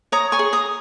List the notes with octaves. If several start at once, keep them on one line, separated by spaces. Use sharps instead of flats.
C#5 A#5 D#6
G#5 C#6
G#4
A#5 D#6